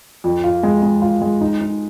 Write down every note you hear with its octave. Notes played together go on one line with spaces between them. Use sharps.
F2
F4
G#3
G#3
F4
G#3
D#4
D#4